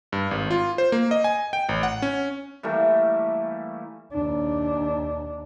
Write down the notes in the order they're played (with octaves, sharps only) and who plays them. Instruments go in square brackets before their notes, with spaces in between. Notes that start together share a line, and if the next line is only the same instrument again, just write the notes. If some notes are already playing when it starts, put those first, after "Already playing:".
[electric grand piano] G2
G#1
F4
C5
A#3
D#5
G#5
G5
A1
F#5
C#4
[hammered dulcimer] E3 G3 A3 A#3
[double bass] D#2 D4